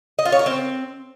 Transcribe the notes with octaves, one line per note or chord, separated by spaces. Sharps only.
D#5
F4
C#5
A#4
C4